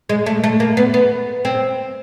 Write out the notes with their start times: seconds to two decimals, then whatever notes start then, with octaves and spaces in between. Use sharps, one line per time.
0.09 G#3
0.26 A3
0.44 A3
0.60 A#3
0.77 B3
0.94 B3
1.45 C4